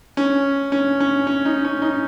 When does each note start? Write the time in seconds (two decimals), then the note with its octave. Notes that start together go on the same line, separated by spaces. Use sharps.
0.17 C#4
0.72 C#4
1.00 C#4
1.27 C#4
1.45 D#4
1.65 C#4
1.82 D#4